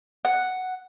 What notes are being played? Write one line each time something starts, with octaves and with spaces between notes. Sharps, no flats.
F#5